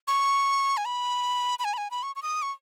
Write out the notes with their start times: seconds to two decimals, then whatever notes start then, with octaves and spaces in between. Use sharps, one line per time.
0.08 C#6
0.77 G#5
0.86 B5
1.59 B5
1.64 G#5
1.74 B5
1.78 G#5
1.91 B5
2.03 C#6
2.16 C#6
2.22 D#6
2.42 C#6